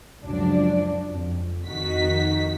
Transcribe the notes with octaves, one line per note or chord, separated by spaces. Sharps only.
C#2 F#2 F3 F#3 D4 D5
F2
F2 D#3 D#4 F#4 B6